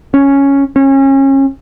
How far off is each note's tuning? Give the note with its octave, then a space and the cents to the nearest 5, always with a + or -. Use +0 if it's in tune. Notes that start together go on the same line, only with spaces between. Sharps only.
C#4 +0
C#4 -30